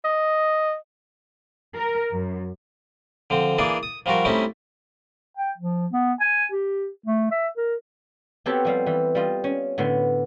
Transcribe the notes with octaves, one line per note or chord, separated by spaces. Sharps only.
D#5
A#4
F#2
D3 F3 C4
E3 A#3 D4 G#4 D5
D#6
F3 G3 F4 F#4 A#4
G3 A3 C4 C#4 D#4 E4
G5
F3
B3
G#5
G4
A3
E5
A#4
B3 C4 F#4 G4 A4 C#5
F3 G3 F5
E3 G3
G3 F4 D#5
C#4
A2 D3 B3 C6